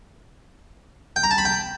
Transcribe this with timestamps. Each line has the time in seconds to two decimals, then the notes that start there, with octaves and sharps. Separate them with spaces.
1.16 G5
1.23 A#5
1.31 A5
1.38 B5
1.45 G5